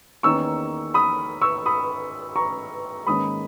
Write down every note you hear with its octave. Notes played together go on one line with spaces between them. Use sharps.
E2 D#3 A#3 C#4 C#6 E6
B5 D#6
C#6 E6
B5 D#6
A#5 C#6
G#2 D#3 A#3 C#4 B5 D#6